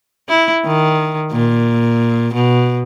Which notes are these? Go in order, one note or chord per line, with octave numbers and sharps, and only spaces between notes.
E4
D#3
A#2
B2